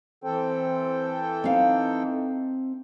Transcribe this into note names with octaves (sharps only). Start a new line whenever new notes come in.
E3 C4 A4 G5
C4 D#4 F5